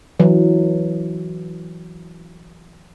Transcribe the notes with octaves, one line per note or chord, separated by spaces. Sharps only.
E3 F#3